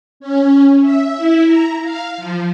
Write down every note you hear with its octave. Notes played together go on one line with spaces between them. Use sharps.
C#4
E5
E4
A#5
F5
F3